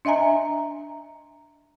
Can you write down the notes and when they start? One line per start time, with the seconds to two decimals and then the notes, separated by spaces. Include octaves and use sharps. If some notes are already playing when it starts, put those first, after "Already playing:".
0.05 D4 D#5 E5 G#5 A#5